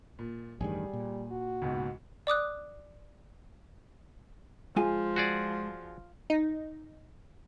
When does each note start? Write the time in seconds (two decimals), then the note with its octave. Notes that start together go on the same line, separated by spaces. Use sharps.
0.19 A#2
0.61 A1 G2 D#3 G3 G#4
0.93 A#2
1.32 F#4
1.62 C#2 G#2 B2
2.27 D5 D6 D#6 F#6
4.76 F3 G#3 F4 G#5
5.16 F#4 G#4 D5
6.30 D#4